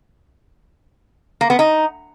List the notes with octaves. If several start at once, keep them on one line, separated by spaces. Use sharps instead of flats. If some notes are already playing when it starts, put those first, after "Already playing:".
A#3
B3
D#4